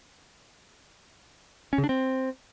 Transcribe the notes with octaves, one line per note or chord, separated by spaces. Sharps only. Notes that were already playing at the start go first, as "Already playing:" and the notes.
C#4
C#3
D4
C4